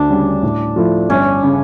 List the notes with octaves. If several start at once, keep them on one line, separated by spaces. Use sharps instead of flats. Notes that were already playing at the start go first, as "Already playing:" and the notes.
Already playing: D2 D4
C#3 G3 C#4
A2
F3 A3 E4
G1 C#4
C#3